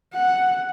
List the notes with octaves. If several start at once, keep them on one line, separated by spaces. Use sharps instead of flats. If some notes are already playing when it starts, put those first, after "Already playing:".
F#5